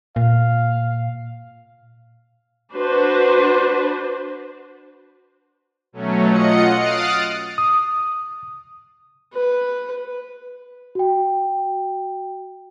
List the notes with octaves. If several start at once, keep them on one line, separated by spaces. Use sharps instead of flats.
A#2 F5
D4 F#4 B4 C5
B2 F#3 A3 C#4
F4 D#5 F#5 C#7
D#6 F6 F#6 A6 C7 D7
D#6
B4
F#4 G5